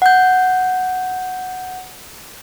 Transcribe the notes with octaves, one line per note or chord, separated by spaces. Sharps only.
F#5 G6